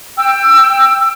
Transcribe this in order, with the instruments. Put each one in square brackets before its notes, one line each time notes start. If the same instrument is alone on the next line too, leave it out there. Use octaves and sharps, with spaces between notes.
[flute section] G5 E6